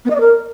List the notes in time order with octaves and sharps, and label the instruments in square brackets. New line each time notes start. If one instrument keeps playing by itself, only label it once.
[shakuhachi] B3
D#5
D5
A#4